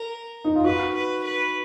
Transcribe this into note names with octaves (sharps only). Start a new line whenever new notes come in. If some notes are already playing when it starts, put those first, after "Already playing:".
Already playing: A#4
D#4
F4
F#4 B4
B4
B4